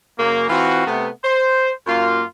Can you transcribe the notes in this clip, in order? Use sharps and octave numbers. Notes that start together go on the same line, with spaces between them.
F#2 C#3 A#3
E3 C4 F4 F#4
C3 A3 B3
C5
F#2 A#3 F4